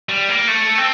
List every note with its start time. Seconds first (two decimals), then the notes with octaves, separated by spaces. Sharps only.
0.09 G3
0.29 A#3
0.48 A3
0.78 C4